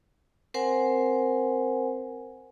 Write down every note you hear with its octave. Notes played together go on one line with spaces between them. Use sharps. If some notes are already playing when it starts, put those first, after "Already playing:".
C4 A#4 C5 F#5 G#5